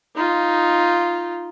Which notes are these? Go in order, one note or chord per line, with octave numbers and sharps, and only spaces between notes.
D#4 F4